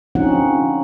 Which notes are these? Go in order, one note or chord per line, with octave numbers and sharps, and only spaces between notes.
D3 F3 C4 C#4 D#4 F#5